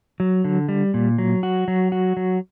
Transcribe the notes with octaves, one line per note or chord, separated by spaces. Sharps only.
F#3
D3
G3
A#2
F#3
F#4
F#3
F#4
F#3